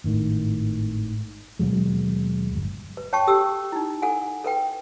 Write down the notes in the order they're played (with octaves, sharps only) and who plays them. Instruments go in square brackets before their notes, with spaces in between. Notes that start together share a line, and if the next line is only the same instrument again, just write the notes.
[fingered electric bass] G#1 A2 D#3
D#2 B2 F#3 G#3
G1
[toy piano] B4
C#5 G5 A5 C#6
G4 A4 G5 D#6 E6
D#4 E4
A4 F#5 G#5
A4 B4 G5